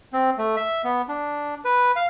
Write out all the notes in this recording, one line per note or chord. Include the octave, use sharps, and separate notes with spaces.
C4
A3
E5
B3
D4
B4
F5